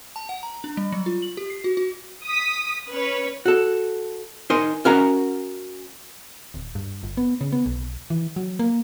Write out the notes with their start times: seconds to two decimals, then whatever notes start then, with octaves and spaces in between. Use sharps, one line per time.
0.16 A5
0.29 F#5
0.43 A#5
0.64 D4
0.77 G3
0.92 F#3
1.06 F4
1.22 F#7
1.37 G4
1.50 C7
1.64 F#4
1.77 F#4
2.25 D#6 B6
2.90 C#4 B4 C#5
3.46 F#4 A4
4.50 D#4 A#4 D#5 G#5 C6
4.85 C#4 F#4 A#4 D#5 F#5 A#5
6.54 D1
6.75 G2
7.03 G1
7.17 B3
7.41 C#3
7.52 B3
7.66 B1
8.10 E3
8.36 F#3
8.59 A#3